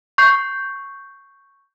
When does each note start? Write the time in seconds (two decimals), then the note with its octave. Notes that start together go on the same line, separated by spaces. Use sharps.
0.18 C#6 G6 C7